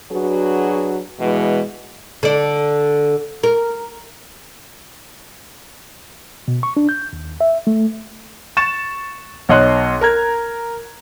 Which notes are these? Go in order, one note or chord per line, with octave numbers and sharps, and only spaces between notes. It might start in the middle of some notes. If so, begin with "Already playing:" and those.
F#3 D4 F#4 G#4 B4
B2 E3 G#3
D3 D5
A#4
B2
C#6
D4
G6
D#2
E5
A3
C#6 A6 E7
B1 C#5 D#5 C6 F#6
A#4 A#5 G#6